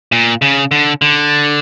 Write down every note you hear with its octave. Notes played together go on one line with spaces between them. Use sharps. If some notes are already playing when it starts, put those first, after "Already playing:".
A#2
C#3
D3
D3